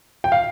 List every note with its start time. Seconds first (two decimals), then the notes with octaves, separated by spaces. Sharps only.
0.24 G5
0.32 F5